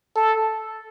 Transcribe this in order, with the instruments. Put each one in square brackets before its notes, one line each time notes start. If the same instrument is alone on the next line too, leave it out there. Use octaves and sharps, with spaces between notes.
[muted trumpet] A4